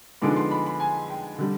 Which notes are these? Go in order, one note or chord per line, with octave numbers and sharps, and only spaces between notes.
D3 F3 G#3 B3 D#4 D6
C6
B5
B5
G#5
G5
D3 G3